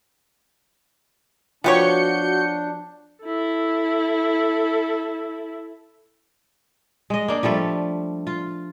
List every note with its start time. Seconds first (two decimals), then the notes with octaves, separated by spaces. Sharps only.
1.64 F3 B3 D4 F#4 G4 C#5 G6 C#7
3.23 E4 A4
7.10 G#3 D#5
7.28 A#3 D4
7.43 F3 G3 A3 A4
8.27 F4